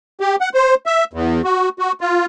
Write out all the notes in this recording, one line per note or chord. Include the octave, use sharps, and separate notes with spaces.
G4
F#5
C5
E5
E2
F#4
F#4
F4